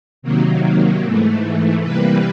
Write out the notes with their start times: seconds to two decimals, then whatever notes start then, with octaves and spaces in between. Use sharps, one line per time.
0.22 C3 D#3 F#3 A#3
1.02 G#2 E3 A3
1.83 C3 E3 G3 A#3 B4